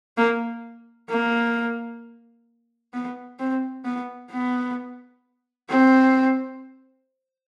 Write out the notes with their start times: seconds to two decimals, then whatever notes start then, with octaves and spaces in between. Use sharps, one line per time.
0.17 A#3
1.09 A#3
2.94 B3
3.39 C4
3.85 B3
4.32 B3
5.70 C4